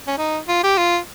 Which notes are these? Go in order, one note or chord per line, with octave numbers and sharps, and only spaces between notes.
C#4
D#4
F4
G4
F4